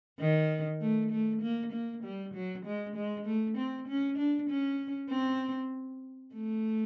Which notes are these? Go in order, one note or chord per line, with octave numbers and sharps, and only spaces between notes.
D#3
A3
A3
A#3
A#3
G3
F#3
G#3
G#3
A3
C4
C#4
D4
C#4
C4
A3